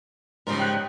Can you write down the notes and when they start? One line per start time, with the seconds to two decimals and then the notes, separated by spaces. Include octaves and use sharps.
0.47 G#2 C#3 F3 G3 A#4
0.59 G5 F#6 G6